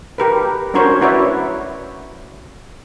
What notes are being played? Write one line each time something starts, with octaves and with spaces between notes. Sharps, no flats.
G4 A#4 B4
C#4 D4 F#4 A#4 C5 C#5
E4 F#4 B4 C#5 D5 E5